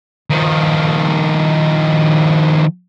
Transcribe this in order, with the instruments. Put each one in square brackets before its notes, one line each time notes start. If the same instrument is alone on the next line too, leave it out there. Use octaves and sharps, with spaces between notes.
[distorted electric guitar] D#3 F3